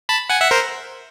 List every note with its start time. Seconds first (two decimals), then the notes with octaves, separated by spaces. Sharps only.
0.09 A5 B5
0.30 F#5 G#5
0.41 E5 F#5
0.51 A#4 C5